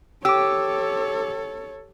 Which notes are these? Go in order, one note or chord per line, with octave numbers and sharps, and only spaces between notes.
G4 A4 C#5 D6 E6